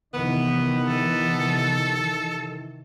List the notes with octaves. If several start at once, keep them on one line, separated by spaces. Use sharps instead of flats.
C3 D#3 E3 B3
A4